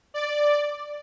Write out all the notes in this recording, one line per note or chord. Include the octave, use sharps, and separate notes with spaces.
D5